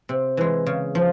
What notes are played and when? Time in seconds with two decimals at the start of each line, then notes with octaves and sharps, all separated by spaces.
0.09 C3
0.37 E3 G#3
0.66 C#3
0.95 F3